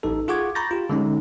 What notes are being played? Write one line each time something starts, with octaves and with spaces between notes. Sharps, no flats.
A1 D#4 A4
F4 G#4 F#5 C#6 D6 G#6
A#5 B5 C#6 G6 A6 A#6
F4 G4
D3 G#3 C#4 D#4